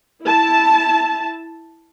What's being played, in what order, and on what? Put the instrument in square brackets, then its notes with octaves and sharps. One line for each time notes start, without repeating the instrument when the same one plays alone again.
[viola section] E4 A5